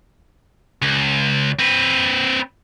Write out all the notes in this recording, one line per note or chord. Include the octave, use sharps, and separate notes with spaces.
C#2
C4 B4